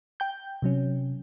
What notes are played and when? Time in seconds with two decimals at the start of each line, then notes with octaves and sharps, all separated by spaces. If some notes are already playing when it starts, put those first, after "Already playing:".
0.20 G5 G6
0.62 C3 F#3 C#4